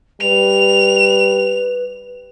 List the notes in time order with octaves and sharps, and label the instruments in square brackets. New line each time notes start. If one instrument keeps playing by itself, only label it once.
[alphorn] G3 [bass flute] B4 [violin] F7